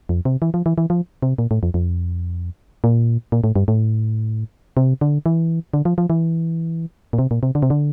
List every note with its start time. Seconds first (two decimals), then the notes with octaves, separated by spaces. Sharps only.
0.09 F2
0.25 C3
0.42 E3
0.54 F3
0.66 E3
0.78 E3
0.90 F3
1.22 C3
1.38 A#2
1.51 A2
1.63 F2
1.74 F2
2.84 A#2
3.32 A#2
3.44 A2
3.56 G2
3.68 A2
4.77 C3
5.01 D3
5.26 E3
5.74 D3
5.85 F3
5.98 F3
6.10 E3
7.13 A#2
7.19 C3
7.31 A#2
7.43 C3
7.55 D3
7.63 C3
7.70 D3